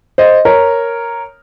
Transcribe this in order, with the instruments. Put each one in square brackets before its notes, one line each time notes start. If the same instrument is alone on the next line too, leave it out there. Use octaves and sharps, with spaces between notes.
[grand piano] C5 D#5
A#4 C#5